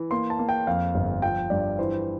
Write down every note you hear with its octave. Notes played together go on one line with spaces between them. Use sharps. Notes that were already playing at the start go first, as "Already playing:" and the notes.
Already playing: E3
A#3 C6
A5
A#3
G5
F2 F5
G1
F3 G5
G2 D5
E3 C5